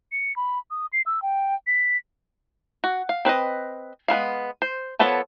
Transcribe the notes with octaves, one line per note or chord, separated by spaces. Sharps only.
C#7
B5
D#6
C7
E6
G5
B6
F#4
F5
C4 B4 C5 D#5
G#3 B3 E4 F5
C5
F3 B3 A4 B4 C#5